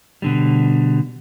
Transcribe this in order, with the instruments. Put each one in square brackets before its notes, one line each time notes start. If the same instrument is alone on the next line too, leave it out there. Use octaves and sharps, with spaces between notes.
[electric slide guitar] B2 D3 G3